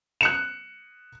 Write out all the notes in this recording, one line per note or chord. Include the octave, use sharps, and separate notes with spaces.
F#6 C#7 E7